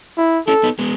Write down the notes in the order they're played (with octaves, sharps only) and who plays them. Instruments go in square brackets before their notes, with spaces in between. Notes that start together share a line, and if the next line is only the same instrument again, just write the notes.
[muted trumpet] E4
[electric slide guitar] C#4 E4 [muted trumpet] A4
[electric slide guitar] B3 D#4
G#3 B3